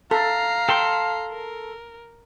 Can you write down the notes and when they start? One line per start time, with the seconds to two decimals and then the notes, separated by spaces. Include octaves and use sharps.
0.11 A4 F5 A#5 C7
0.69 A4 G5 A5 C6
1.31 A#4